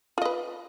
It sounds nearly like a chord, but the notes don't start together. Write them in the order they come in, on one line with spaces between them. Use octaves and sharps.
F4 D#5 B4